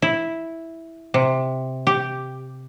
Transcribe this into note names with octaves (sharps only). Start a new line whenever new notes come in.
E4
C3
G4